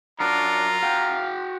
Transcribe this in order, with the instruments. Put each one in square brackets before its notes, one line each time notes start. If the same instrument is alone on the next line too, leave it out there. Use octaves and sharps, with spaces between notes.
[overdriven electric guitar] F#3 A#4 [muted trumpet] D4 [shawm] F4 [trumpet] A#5
[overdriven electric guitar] F#4 G5 [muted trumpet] F5